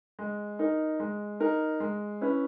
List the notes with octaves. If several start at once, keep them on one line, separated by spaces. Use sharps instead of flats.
G#3
D#4 A#4
G#3
D#4 A#4
G#3
C#4 E4 B4